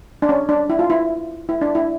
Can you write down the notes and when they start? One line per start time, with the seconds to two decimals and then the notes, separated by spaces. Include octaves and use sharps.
0.22 D4
0.29 C#4
0.49 D4
0.70 E4
0.79 F4
0.90 E4
1.49 E4
1.61 D4
1.75 E4